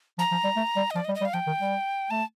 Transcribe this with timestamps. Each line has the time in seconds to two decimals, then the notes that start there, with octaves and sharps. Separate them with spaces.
0.18 F3 A#5
0.32 F3
0.44 G3
0.57 A3
0.76 G3
0.90 D#5
0.95 F3 D5
1.05 D#5
1.09 G3
1.15 D#5
1.21 G3
1.25 F5
1.33 F3 G5
1.47 D#3
1.59 G3
2.10 A3 A5